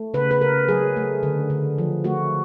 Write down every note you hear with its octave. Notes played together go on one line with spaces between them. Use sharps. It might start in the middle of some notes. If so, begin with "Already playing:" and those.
Already playing: A3
C#3 B4
B4
C#3 A#4
F#3 G#4
A3
D3
D3
F3
A3 F#4